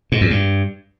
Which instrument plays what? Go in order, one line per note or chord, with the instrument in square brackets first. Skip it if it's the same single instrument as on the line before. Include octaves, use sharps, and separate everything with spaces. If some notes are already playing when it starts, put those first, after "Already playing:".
[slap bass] G#2
E2
G2